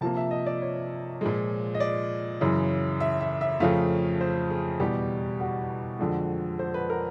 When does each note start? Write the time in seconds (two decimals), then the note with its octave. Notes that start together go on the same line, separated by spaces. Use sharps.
0.01 C3 F3 A#3 A5
0.17 E5
0.31 D#5
0.46 D5
0.62 C#5
1.21 A#2 F3 G#3
1.75 D#5
1.80 D5
2.41 F#2 C#3 E3
3.00 E5
3.21 E5
3.41 E5
3.60 F2 C#3 F3 A3 F5
4.21 C5
4.50 G#4
4.80 E2 B2 G3 G4
5.40 F#4
5.99 F2 D3 F3 G#3
6.59 C5
6.74 B4
6.90 A#4